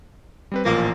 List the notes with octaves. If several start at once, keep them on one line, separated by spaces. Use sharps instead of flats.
G3 C4 B4
A1 A#2 F3 A#3